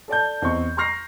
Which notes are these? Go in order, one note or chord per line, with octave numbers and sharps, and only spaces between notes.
A4 D5 A5 G6
E2 C4 D#5 C#6
A#5 C6 C#6 F6 A#6 C7